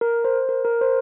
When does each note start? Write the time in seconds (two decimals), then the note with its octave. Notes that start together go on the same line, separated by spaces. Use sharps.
0.01 A#4
0.24 C5
0.49 A#4
0.65 A#4
0.81 C5